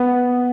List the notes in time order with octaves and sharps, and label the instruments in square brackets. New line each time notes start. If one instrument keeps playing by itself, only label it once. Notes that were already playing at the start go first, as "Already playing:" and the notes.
Already playing: [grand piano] B3